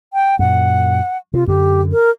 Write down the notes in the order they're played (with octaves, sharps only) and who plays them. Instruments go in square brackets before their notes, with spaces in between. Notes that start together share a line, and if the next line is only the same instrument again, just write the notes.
[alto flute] G5
[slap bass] F#2 A#2 [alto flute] F#5
[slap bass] C3 [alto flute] F4
[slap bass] F#2 D3 [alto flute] G4
[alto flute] A#4